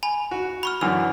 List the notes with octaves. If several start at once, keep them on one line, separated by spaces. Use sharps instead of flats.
G#5 B5
F#4
B5 C#6 F6
F#2 D3 E3 F6